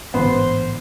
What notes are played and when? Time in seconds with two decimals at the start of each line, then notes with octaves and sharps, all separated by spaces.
0.14 A1 G#2 D3 B3 C5